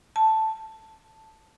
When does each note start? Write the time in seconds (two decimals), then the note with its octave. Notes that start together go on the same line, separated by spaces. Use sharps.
0.16 A5